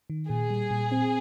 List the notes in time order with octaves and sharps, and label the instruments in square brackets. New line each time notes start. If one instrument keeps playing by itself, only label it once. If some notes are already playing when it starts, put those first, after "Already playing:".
[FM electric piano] D#3
[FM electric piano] A#2 [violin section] G#4
[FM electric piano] G3
A#2
C4